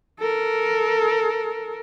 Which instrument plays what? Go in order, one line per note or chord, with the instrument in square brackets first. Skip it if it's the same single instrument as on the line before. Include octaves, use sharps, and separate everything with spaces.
[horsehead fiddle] A4 A#4